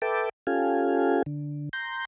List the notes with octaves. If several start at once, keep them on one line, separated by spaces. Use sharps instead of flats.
A4 B4 E5 G5 A5 D6
C#4 F4 G4 A4 F5 G#5
D3
A#5 C6 G6